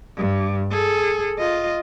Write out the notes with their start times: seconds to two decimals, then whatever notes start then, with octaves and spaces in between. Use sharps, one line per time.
0.17 G2
0.71 G#4 A4
1.39 F4 D#5